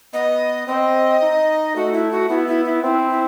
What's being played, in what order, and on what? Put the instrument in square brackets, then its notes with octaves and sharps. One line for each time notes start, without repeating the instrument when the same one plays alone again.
[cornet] B3 [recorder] D#5
[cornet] C4 [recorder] D#5
[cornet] D#4
[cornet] A3 [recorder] F#4
[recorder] E4
F#4
[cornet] B3 [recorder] E4
[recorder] E4
E4
[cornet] C4 [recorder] E4
[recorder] E4